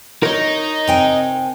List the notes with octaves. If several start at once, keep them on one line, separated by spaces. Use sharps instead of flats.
D#4 A#4 C#5
C3 G5 G#5